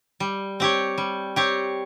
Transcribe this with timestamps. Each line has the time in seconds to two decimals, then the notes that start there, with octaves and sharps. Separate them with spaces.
0.20 G3
0.60 C4 G4 C#5
0.98 G3
1.36 C4 G4 C#5